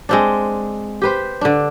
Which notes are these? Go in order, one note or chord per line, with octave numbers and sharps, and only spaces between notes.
G#3 C4 D4
G4 B4 C5
D3 D4